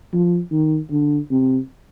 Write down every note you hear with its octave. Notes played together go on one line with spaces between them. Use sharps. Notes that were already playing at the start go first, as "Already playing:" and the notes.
F3
D#3
D3
C3